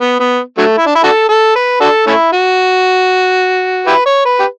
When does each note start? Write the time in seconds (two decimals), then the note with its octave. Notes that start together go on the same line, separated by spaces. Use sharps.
0.01 B3
0.20 B3
0.58 D3 F#3 A3
0.78 E4
0.86 D4
0.95 E4
1.04 D4 F#4 A4
1.29 A4
1.55 B4
1.80 D4 F#4 A4
2.07 A3 C#4 E4
2.32 F#4
3.87 E4 G4 B4
4.06 C#5
4.25 B4
4.39 G4